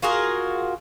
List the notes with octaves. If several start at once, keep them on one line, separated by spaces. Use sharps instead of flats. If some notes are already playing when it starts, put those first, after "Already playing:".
F4 F#4 G#4 A#4